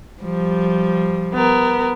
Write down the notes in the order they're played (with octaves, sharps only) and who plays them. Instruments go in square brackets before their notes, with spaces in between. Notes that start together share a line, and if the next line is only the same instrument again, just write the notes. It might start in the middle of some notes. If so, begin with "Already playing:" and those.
[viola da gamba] F3 G3
[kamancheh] B3 A#4